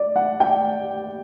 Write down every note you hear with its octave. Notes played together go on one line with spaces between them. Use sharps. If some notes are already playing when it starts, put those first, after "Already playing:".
Already playing: D5
F#5
G5